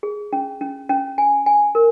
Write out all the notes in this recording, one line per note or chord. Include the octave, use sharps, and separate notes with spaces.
G#4
C#4
C#4
C#4
G#5
G#5
A#4